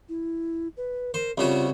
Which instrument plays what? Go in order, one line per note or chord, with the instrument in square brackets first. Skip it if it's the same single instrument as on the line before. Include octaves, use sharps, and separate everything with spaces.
[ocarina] E4
B4
[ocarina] A#4 [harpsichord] C5
[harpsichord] C2 C#3 F#4 [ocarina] F4